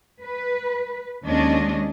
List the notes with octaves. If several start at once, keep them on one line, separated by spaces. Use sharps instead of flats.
B4
D#2 G#3 C#4 D4 D#5